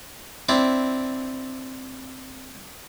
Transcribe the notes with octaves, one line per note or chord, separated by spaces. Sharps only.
C4 D4 E4